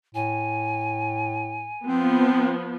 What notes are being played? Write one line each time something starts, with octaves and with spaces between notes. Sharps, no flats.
A2 G#5
F3 B3 C4